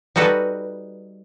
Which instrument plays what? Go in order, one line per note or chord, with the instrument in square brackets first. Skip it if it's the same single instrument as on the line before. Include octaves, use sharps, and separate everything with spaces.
[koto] G3 D#4 F#4 A4 B4